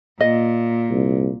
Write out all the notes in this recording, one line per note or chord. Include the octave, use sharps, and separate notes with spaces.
A#2 D#5
C2